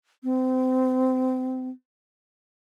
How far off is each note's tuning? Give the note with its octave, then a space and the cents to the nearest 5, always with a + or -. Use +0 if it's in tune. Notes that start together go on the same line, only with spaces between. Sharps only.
C4 -30